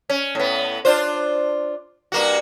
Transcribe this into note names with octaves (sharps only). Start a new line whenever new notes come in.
C#4
A2 B3
D4 F4 C5
G2 A#3 F#4